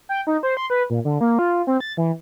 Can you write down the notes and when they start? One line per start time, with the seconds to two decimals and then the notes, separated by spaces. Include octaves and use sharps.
0.09 G5
0.27 D#4
0.43 C5
0.57 C6
0.70 B4
0.90 A#2
1.05 D3
1.21 A#3
1.39 F4
1.67 C4
1.80 A6
1.97 E3